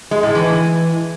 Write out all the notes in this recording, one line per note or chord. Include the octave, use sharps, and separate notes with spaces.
G#3
A2
E3